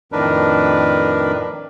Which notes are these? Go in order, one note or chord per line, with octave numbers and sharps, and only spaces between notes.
F2 A2 D#3 D4 A#4 B4